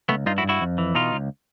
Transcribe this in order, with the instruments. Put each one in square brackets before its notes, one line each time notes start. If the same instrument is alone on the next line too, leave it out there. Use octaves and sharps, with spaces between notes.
[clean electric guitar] C#2 A3 B3
G2 D#4 F4
E4 F#4
G2
E4 F#4
F2
E3
B2 D#4 F4
C#2